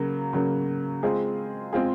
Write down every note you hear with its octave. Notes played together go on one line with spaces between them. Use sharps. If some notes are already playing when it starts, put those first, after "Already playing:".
Already playing: C#3 F#3 A#3
C#3 F#3 A#3
G#3 C4 F4 G#4
G#3 C4 F4 G#4